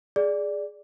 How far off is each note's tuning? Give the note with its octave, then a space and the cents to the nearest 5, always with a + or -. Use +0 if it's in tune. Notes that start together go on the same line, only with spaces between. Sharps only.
G#4 -5 D5 +0